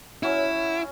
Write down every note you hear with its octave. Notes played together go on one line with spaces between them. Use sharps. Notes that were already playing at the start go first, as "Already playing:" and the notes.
F#3 C#4 E4